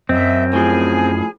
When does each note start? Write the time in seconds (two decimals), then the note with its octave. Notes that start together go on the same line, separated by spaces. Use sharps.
0.09 F#2 C4 D#5 E5
0.53 A2 F3 G#4 G#5